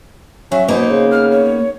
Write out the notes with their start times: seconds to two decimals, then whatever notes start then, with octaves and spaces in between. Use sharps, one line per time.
0.52 F#3 C#4 E5
0.68 B2 A#3 B3 D#4 C5
0.90 C#3
1.11 F6
1.31 C#5